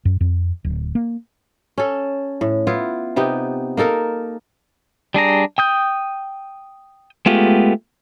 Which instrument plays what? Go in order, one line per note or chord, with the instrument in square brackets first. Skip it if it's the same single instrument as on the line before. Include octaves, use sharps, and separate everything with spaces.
[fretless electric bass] F#2
F2
D1
A#3
[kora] C#4 A4
A2
B3 E4 F4
C3 B3 D#4 G4
A#3 D#4 A4 A#4
[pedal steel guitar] G3 D4 G#4 A#5
G5 D#6 G6
G#3 A3 B3 F4 G4